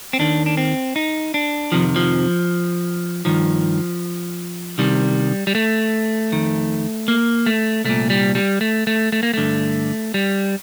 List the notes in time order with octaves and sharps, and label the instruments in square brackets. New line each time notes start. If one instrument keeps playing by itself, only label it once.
[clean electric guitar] C4
D#2 D#3 D4
D4
C4
D#4
D4
F2 C3 D#3 F3
F3
G2 D#3 F3
C2 C3 D#3 G3
G3
A3
F2 D#3
A#3
A3
C2 A#2 A3
G3
G3
A3
A3
A3
A#3
G2 D3 A3
G3